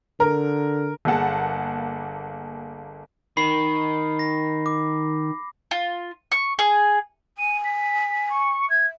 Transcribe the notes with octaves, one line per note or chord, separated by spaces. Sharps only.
D3 A#4
G1 A#3 G#4 F#5 A5
D#3 B5 C7
A#6
D6
F4
C#6
G#4
G#5 D#7
B6
C#6
E5 G#6